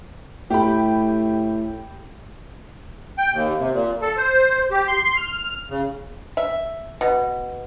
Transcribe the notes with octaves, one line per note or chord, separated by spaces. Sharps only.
A2 G4 B5
G5
D#2
C3
A#2
A4
C5
G4
C6
F6
C#3
E5
B2